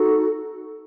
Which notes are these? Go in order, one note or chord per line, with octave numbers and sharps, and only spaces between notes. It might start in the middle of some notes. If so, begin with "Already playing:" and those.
Already playing: D#4 F#4 A4